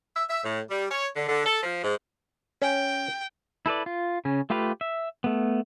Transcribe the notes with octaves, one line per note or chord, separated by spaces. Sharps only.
E5
E5
A2
G3
C#5
D3
D3
A4
F3
G#2
C#4 G5
E4 A4 B4 D5
F4
C#3 C#4
A3 F4 G4 B4 F5
E5
A3 B3